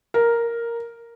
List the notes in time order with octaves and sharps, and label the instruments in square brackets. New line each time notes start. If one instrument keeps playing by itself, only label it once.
[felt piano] A#4